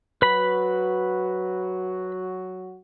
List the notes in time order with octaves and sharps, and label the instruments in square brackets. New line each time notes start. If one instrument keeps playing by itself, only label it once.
[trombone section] F#3 F#4 [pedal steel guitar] B4 B5